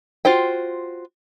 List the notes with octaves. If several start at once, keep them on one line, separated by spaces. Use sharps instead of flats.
F4 F#4 C5 G5